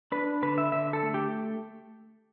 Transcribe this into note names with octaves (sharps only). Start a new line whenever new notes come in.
D4 B4
D3 B4
E5
D3 E5
A4
A3
G4